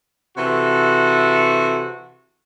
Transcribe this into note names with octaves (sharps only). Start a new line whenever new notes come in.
C3 E3 F#4 A4